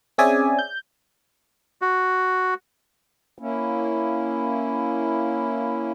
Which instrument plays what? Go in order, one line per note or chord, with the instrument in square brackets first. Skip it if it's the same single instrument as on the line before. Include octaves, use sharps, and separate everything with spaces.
[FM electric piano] C4 C#4 G#4 D5 E5 G#5
G6
[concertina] F#4
[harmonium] A#3 C#4 E4